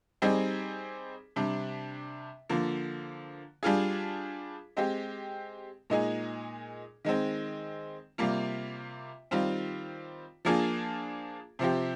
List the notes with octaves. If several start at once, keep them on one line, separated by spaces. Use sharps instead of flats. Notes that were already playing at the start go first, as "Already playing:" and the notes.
G3 C4 D#4 G#4
C3 G3 D4
D3 F3 A#3
G3 D4 F4 G#4
G#3 C4 G4
A#2 G#3 D#4 G#4
D#3 G#3 C4
C3 G3 A#3 F4
D#3 G3 C4 F4
F3 A#3 D4 F4 G#4
C3 F3 C4 G4